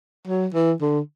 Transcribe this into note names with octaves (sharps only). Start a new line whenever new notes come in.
F#3
E3
D3